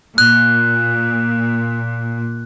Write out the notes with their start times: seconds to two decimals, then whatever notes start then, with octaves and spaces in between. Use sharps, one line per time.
0.18 A#2 F#6